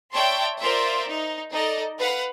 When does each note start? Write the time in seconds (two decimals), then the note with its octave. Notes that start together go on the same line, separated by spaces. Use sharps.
0.13 C#5 D5 E5 G5 A5 C6
0.62 F4 A#4 C5 D5 E5
1.08 D#4
1.53 D#4 A4 D5 D#5
1.98 B4 F5 F#5